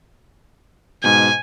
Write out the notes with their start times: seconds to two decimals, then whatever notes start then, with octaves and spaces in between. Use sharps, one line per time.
1.04 G#2 B2 G#5